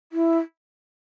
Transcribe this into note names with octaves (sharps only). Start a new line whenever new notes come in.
E4